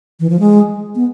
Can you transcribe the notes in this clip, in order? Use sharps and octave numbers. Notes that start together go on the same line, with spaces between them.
E3
F3
G#3
B3